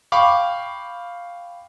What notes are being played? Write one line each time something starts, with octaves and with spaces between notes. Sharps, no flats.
F5 G5 B5 C#6 D6